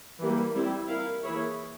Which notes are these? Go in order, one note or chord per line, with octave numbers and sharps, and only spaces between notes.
E3 G3 A#3
G3 C4 E4
E4 A#4 F5
E3 A#3 E4 G#4 C#5